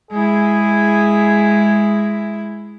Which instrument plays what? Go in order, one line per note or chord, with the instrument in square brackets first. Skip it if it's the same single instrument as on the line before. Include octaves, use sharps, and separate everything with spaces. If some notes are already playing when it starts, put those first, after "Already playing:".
[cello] G#3 E4 [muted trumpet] G#4